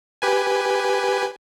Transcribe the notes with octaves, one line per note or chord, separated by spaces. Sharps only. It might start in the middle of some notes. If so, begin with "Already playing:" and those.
G4 B4 G#5